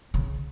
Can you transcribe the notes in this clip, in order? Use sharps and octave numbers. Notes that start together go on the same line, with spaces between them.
C#3